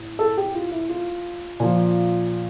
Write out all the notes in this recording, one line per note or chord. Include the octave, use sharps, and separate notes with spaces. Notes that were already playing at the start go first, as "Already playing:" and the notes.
Already playing: A2
A4
G4
F4
E4
F4
A#2 F3